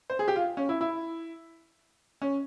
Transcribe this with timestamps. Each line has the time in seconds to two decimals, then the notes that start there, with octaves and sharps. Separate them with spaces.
0.10 C5
0.19 G#4
0.28 G4
0.36 F4
0.57 C#4
0.69 E4
0.81 E4
2.22 C#4